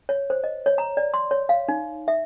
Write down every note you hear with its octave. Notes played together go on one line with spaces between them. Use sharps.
C#5
C5
D#5
C#5
A#5
D5
C6
C#5
F5
D#4
E5